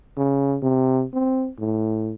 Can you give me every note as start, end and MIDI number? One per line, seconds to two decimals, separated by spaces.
0.17 0.57 49
0.62 1.04 48
1.13 1.49 60
1.59 2.14 45